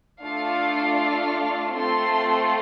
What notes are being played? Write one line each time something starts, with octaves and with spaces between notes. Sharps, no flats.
A3 D4 F4 A4 F5
A3 C4 F4 A4 C6